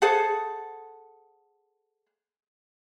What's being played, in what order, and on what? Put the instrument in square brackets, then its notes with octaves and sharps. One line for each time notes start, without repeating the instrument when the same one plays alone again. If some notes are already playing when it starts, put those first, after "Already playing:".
[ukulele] G#4 A4 C5 F#5